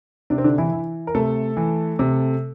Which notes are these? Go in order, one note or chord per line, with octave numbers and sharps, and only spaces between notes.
C3 D4
C4
D3 D4
E3 E4
E3
A#4
C3 A3 A4
E3
C3